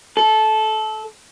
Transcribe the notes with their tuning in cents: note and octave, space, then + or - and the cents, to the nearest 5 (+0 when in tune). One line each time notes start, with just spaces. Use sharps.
A4 -20